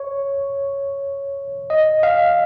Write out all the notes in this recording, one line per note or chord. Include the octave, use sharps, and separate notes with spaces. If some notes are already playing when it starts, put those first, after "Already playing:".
Already playing: C#5
D#5
F5